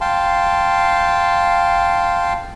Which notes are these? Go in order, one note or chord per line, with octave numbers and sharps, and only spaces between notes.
F5 G5 A5 C6